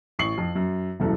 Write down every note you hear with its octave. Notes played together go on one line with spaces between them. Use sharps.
A1 C#6 C7 F#7
F2
F#2
E1 C2 F#2 A4